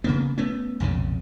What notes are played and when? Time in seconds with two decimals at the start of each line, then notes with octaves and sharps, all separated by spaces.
0.04 C#3 A#3 B3
0.38 A3 B3 C#4
0.80 B1 F2 A#2 C#3